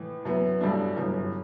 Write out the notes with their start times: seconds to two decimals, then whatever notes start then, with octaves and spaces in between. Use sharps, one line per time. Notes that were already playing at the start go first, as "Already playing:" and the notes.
Already playing: A2 E3
0.25 F#2 F#3 B3 E4
0.61 A1 G2 F#3 A3 D4
0.96 G1 F#2 E3